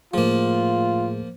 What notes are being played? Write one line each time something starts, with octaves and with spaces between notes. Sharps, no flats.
A2 F3 A3 A#3 F4 G#4